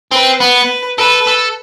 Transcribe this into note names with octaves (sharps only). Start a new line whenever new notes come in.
C4 B4
B3
B4
A4 B4
A4